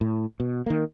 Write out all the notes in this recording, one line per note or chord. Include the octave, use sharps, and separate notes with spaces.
A2
B2
D#3 A#3